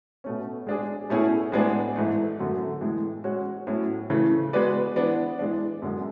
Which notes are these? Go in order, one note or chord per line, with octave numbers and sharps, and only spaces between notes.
B2 A3 C#4
G#3 D4 G#4
B2 A3 C#4 E4 G#4
A2 G#3 B3 D4 G#4
G#2 E3 A3
F#2 D3 F#3 A3
A2 E3 G#3
G#3 C#4 F#4 C#5
A2 F#3 C#4
C#3 E3 A3
G#3 B3 F#4 B4 D5
E3 B3 D4
E3 G#3 D4
F#2 D3 G#3